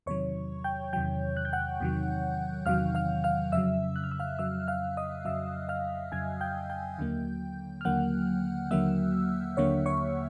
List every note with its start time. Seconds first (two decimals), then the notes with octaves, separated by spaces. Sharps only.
0.06 E2 C3 D#3 F#3 C#5 C#6
0.64 G5 G6
0.93 E2 C3 D#3 F#3 G5 G6
1.37 F#6
1.45 G6
1.53 F#5 F#6
1.80 E2 C3 D#3 F#3
2.66 E2 C3 D#3 F#3 F5 F6
2.95 F5 F6
3.24 F5 F6
3.52 F2 C#3 F#3 E5 E6
3.96 F#6
4.04 F6
4.11 E6
4.20 F5 F6
4.39 F2 C#3 F#3 E5 E6
4.68 F5 F6
4.97 D#5 D#6
5.25 F2 C#3 F#3 E5 E6
5.69 F5 F6
6.12 F2 C#3 F#3 G#5 G#6
6.41 G5 G6
6.70 G5 G6
6.98 D#2 D3 F#3 A#3
7.81 F6
7.85 D#2 D3 F#3 A#3 F#5 F#6
8.71 D#2 D3 F#3 A#3 E5 E6
9.57 D#2 D3 F#3 A#3 C#5 C#6
9.86 C#5 C#6